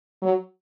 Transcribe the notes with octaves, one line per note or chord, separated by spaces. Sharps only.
F#3